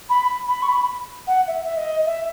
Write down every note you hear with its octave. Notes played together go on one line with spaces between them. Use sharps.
B5
B5
C#6
B5
F#5
E5
E5
D#5
E5